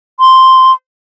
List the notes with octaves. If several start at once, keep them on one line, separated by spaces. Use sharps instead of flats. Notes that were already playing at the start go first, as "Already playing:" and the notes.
C6